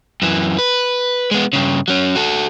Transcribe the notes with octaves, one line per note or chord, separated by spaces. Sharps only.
F#2 E3
B4
G#3 B3
G2 C#3
F#3 C#4
F#4 A4